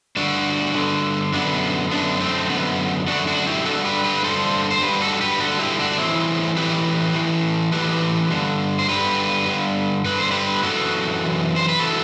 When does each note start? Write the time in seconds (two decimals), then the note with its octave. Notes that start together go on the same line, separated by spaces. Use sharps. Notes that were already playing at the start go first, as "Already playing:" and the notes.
0.16 G2 D3 D4 F#4
0.75 G2 D3
1.33 F#2 D3 B3 D4
1.91 F#2 D3 B3 D4
2.20 A3 C4
2.50 F#2 D3 B3
3.07 F#2 D3 D4 F#4
3.27 D4 F#4
3.46 E4 G4
3.65 G2 D3 F#4 A4
3.85 G4 B4
4.04 G4 B4
4.24 G2 D3 A4 C5
4.71 C5
4.82 G2 D3 G4 B4
5.02 F#4 A4
5.21 G4 B4
5.40 G2 D3 F#4 A4
5.59 E4 G4
5.79 D4 F#4
5.98 A2 E3 C4 E4
6.56 A2 E3 G4 B4
7.14 A2 E3
7.72 A2 E3 G4 B4
8.31 G2 D3
8.79 C5
8.88 G2 D3 G4 B4
9.48 G2 D3
10.05 G2 D3 B4
10.18 C5
10.31 G4 B4
10.63 F#2 E3 F#4 A4
11.21 F#2 E3
11.56 C5
11.68 B4
11.79 E3 F#4 A4